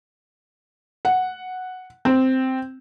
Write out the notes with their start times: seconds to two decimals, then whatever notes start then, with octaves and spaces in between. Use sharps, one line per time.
1.05 F#5
2.05 C4